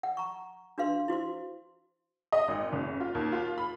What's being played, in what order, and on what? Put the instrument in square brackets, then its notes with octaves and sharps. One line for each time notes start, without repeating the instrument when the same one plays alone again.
[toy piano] F#5
A#5 C#6
D4 F#4 B4 F5 C6
E4 F#4 C5 C6
[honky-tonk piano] D#5
G#1
F#1
F4
D#2
F4
B5